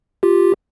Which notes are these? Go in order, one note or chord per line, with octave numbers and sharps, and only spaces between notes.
F4 G4